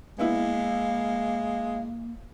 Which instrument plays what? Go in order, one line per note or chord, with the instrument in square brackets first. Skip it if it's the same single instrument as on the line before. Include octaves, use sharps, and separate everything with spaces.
[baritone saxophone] G#3 [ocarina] A#3 [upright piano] B3 E4 [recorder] F5